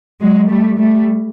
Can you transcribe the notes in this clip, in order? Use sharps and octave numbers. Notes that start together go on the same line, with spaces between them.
F#3 G#3
G3 A3
G3 A3